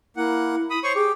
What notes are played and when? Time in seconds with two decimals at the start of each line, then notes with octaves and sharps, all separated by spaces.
0.17 A#3 E4 F#5
0.70 B5 D#6
0.84 C5 C#5 C#6
0.95 G4 G#4